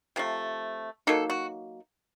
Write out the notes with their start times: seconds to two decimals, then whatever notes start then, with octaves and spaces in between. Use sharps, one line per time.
0.16 C3 F3 A3
1.07 F#3 A#3 D#4 A4
1.30 F#4